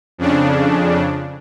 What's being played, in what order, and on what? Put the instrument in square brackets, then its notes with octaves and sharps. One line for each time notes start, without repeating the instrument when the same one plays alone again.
[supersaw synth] F2 C#3 D4